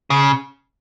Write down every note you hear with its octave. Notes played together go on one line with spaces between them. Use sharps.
C#3